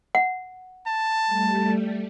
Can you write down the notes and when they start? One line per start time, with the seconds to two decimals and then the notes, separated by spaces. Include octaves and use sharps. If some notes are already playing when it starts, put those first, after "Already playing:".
0.15 F#5
0.87 A5
1.26 G3 A3